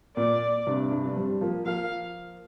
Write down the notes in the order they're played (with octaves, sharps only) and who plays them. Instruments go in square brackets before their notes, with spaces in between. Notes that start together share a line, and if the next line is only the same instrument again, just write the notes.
[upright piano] A#2 [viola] D5
[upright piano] G2 C3
G2 C3
D4
G3 C4
F3 A#3
[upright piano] F3 A#3 [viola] F5